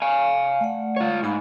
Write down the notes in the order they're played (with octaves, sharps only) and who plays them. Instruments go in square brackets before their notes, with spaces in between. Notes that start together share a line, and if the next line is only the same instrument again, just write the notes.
[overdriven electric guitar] F5 G#5
[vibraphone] A3 D5 F#5
[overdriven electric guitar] F4 C#5
[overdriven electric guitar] G#2 [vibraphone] D#4 G#5 B5